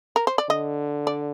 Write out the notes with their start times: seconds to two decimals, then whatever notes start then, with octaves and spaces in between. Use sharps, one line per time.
0.16 A#4
0.27 C5
0.38 D5
0.49 D3 D#5
1.07 D5